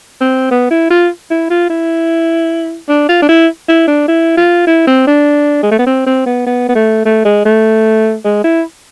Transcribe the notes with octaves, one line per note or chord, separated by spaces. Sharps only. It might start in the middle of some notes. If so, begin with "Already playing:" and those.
C4
B3
E4
F4
E4
F4
E4
D4
F4
D4
E4
E4
D4
E4
F4
E4
C4
D4
G#3
A3
B3
C4
C4
B3
B3
B3
A3
A3
G#3
A3
G#3
E4